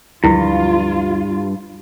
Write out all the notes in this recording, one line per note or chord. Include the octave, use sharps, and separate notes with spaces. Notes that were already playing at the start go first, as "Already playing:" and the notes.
D2 G2 F3 F#3 E4 F4